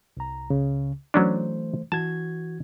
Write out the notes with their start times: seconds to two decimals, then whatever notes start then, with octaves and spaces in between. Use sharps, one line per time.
0.17 C2 A#5
0.50 C#2 C#3
1.14 E3 F#3 A3 C#4 D4 C5
1.92 E3 F#4 A5 G#6